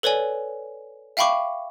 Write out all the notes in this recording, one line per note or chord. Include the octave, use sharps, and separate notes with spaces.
A4 B4 C#5 D5 G#5
E5 F5 G5 B5 C#6 D6